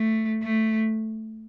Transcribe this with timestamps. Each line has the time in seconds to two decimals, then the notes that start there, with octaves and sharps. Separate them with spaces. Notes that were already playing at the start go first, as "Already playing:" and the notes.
Already playing: A3
0.42 A3